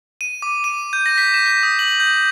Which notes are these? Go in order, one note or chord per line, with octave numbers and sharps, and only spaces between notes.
D#7
D6
D#7
G6
A#6
B6
E7
B6
D#6
F#7
G6